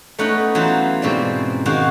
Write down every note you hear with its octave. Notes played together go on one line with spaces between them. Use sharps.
A3 B3 C#4 D#4 D#5 F#5
E3 F#3 B3 F4 C5
G#2 B2 C4 C#4 D5
D#3 G#3 F#4 F5